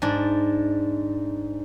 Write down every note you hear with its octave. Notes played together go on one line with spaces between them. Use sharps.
G#2 D4